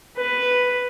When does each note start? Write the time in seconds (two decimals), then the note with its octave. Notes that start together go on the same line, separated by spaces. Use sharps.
0.17 B4